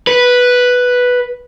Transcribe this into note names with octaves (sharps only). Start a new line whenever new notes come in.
B4